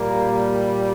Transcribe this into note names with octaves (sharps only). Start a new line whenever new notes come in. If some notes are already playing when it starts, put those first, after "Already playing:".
Already playing: A#2 G3 A#3